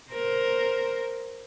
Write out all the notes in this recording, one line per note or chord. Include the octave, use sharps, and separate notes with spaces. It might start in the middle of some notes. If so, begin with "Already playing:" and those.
A#4 C5